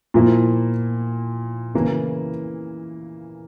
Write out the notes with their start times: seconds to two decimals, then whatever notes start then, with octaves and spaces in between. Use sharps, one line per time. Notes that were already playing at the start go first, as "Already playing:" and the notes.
0.14 A#2 F3 A#3 E4
1.74 C#3 E3 A#3 E4